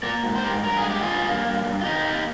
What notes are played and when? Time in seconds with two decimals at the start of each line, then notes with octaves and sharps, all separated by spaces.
0.03 A#3 A#4 D5
0.24 G#2
0.36 C5
0.44 G#2 G4 A#4
0.64 G2 A#4
0.77 G#4
0.84 G#3
0.90 G4
1.03 G2 F4 G#4
1.25 A#3
1.45 G2
1.65 G2
1.81 F4
1.85 C3 D#4 G4
2.06 A#3